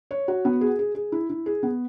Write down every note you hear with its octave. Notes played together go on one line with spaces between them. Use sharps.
C#5
F#4
B3
G#4
G#4
G#4
E4
E4
G#4
B3